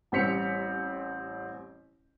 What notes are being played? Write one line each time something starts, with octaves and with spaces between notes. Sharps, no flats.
A1 G3 C4 B6 C#7 F7